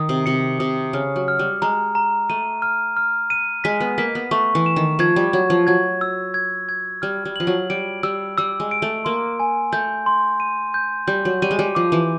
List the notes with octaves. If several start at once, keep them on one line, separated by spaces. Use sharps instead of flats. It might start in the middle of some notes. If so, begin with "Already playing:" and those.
Already playing: D#3 D#6
C3
C3 C#7
C3 D#6
C#3 F6
F#3
F6
G3
G#3 A#5
A#5
A3 D#7
F6
F6
D#7
G#3 B6
B3
A#3 B6
B3
A3 C#6
E3
E7
D#3
F3 G#6
G3
F#3 G#6
F3
F#3 G#6
E6
G#6
G#6
G3 F6
G3
F3 F#7
F#3
G3 D7
G3 E6
G3 E6
G#3
D7
A3
A#3 C6
G#5
A3 G6
C6
D#7
G6
G3 G6
F#3
G3 D#7
G#3
G3
F3 D6
E3